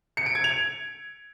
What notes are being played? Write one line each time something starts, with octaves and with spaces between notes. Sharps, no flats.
C#7
D7
G#6
F7